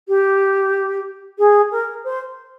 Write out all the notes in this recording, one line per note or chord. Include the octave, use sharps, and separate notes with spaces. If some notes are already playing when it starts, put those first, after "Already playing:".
G4
G#4
A#4
C5